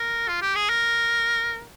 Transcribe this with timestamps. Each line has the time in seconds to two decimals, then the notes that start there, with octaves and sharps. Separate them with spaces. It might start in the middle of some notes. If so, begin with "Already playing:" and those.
Already playing: A#4
0.28 F4
0.42 G4
0.55 G#4
0.69 A#4